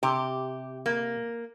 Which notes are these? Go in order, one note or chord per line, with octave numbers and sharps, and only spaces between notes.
C3 G4
A#3